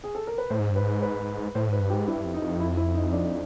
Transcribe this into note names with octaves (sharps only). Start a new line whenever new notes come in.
G#4
A4
A#4
B4
A2 C5
G#2
G2
B4
G#2
B4
A2 C5
G#2 B4
G2
G4
G#2
G2 E4
F2
D#4
F2
E4
E4
D#4
D4